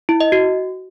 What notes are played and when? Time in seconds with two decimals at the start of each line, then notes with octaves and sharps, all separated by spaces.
0.09 E4
0.20 D#5
0.32 F#4